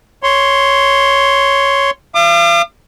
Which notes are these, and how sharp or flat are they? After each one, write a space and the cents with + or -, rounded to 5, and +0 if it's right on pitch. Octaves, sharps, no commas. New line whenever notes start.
C#5 +0 C6 +0
F5 -40 D6 +40